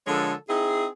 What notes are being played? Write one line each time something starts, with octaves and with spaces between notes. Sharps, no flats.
D3 F3 G#3 A4 A#4 C#5
C4 D#4 E4 G#4